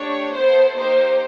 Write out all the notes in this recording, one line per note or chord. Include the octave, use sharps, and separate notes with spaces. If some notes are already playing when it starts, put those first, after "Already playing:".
Already playing: A3 D4 G4 C#5
B3 E4 A4 C5
A#3 D#4 G4 C5